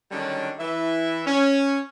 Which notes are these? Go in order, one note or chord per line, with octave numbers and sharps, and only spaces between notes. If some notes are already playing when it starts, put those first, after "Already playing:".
D3 D#3 F#3 G3 C#4 D4
E3 E5
C#4